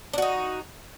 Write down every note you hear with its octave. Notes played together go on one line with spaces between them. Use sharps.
D4 D#4 F#4